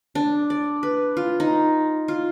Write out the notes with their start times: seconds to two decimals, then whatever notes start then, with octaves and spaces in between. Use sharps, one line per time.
0.15 D4
0.50 D5
0.83 B4
1.17 F4
1.40 D#4
2.08 F4